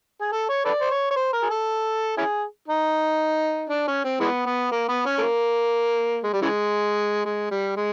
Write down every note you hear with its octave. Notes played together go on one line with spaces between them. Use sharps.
G#4
A4
C#5
A4 B4 D5
C5
C#5
C#5
C5
A#4
G#4
A4
C#4 E4 G#4
D#4
D4
C#4
C4
E3 G#3 B3
B3
A#3
B3
C#4
A3
A#3
G#3
G3
C#3 E3 G#3
G#3
G3
G#3